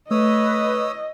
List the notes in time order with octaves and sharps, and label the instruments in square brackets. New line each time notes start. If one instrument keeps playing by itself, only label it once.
[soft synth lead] A3 [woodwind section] B4 [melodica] C#5 D#6 E6 [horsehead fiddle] D#5